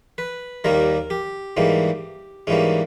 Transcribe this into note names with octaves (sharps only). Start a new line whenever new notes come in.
B4
D#2 D#3 G3 A#3 A#4
G4
G#2 E3 G3 A#3
G#2 E3 G3 A#3 C#4